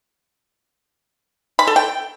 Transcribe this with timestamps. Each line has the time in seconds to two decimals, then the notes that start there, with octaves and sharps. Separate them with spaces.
1.59 B5
1.67 A4
1.76 G5